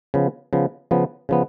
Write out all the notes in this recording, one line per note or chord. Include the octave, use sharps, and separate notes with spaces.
C#3 F3 B3
C#3 F3 B3
C#3 F3 B3
C#3 F3 B3